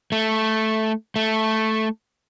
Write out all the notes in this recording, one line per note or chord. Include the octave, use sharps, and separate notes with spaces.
A3
A3